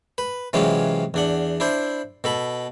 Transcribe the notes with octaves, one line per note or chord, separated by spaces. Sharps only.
B4
C3 E3 F#3 G#3 C#4 F4
E2 D4 F#5
D4 E4 C5
B2 A4 B5